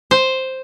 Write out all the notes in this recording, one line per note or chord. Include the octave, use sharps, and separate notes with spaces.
C5